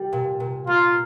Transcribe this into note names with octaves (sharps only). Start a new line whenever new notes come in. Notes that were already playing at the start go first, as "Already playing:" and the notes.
Already playing: G3
A#2
A#2
A#3 F4